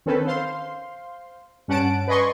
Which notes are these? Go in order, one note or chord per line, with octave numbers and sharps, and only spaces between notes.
D#3 C4 C#4 A4 B4
C5 F5 C6
G2 C#4 F#5 A5 D7
B4 D5 D#5 G#5 C6 C#6